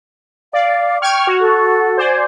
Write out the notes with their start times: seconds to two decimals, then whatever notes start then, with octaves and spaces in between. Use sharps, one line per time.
0.53 D5 F5
1.02 G5 C#6 F6 G#6
1.27 F#4
1.40 A4
1.97 C5 D5 G#5